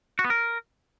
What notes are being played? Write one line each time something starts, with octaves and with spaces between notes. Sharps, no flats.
F#4
B3
A#4